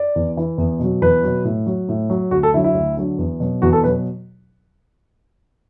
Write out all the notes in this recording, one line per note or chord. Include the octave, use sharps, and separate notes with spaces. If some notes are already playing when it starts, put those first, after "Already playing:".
Already playing: D5
E2
E3
E2
B2 F#3
E2 B4
B2 F#3
A2
F#3
A2
F#3
D2 F#4
A4
D3 F#3 E4
E4
D2
D3 F#3
E2
B2 F#3
E2 F#4
A4
B2 F#3 B4